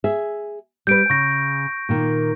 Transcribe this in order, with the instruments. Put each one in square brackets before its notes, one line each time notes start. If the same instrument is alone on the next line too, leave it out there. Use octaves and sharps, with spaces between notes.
[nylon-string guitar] G#4 E5
[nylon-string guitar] G3 B4 [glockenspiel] G6 D7
[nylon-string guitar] C#3 [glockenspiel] C#6 A#6
[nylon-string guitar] A#2 D#3 A#3